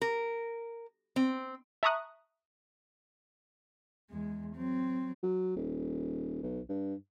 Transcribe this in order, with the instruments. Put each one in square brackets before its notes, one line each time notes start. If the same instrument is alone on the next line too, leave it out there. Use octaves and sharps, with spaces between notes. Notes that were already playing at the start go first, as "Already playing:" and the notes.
[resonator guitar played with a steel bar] A#4
C4
[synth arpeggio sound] E5 A5 A#5 C#6 D#6 F#6
[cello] E2 G#3
F#3 C4
[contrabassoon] F#3
D#1
B1
G2